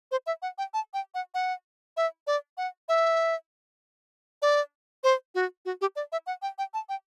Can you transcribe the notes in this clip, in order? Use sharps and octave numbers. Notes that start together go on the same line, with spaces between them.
C5
E5
F#5
G5
A5
G5
F#5
F#5
E5
D5
F#5
E5
D5
C5
F#4
F#4
G4
D5
E5
F#5
G5
G5
A5
G5